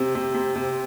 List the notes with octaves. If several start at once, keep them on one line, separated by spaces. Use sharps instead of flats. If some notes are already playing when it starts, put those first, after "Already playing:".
Already playing: C3 C4
C3
C3
C3